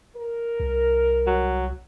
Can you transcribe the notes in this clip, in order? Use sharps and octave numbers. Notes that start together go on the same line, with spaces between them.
A#4
C2
F#3